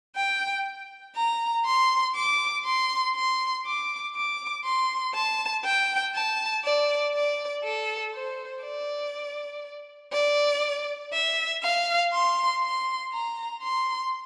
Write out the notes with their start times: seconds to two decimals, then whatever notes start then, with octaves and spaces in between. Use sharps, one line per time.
0.16 G5
1.16 A#5
1.66 C6
2.15 D6
2.65 C6
3.16 C6
3.65 D6
4.15 D6
4.65 C6
5.14 A5
5.64 G5
6.15 A5
6.64 D5
7.14 D5
7.64 A4
8.14 C5
8.64 D5
10.13 D5
11.13 E5
11.62 F5
12.13 C6
12.63 C6
13.12 A#5
13.63 C6